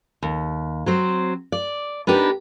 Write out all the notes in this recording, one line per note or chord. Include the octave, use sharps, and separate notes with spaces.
D#2
F#3 C4 C5
D5
B3 D4 D#4 G4 A#4 B4